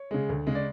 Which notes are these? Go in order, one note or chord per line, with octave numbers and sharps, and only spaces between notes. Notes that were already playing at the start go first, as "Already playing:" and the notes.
Already playing: C#5
C#3 G#3
D2
C#3 G#3
D5